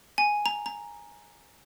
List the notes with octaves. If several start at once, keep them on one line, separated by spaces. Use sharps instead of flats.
G#5
A#5
A#5